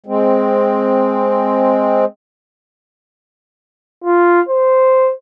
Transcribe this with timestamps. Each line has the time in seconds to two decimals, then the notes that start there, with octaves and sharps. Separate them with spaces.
0.06 G#3 C4
4.04 F4
4.49 C5